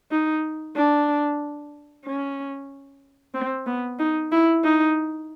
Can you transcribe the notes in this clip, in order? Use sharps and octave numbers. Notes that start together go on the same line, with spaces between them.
D#4
D4
C#4
C4
B3
D#4
E4
D#4